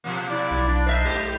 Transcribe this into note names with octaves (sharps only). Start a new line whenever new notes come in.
B2 F3 A#3
E4 D5
B1
D4
A#4 C5 D#5 E5
G#2 G4